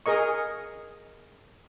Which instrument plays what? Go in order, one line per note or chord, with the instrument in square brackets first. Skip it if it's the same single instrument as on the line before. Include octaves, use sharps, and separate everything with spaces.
[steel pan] G#4 A#4 D#5 C#6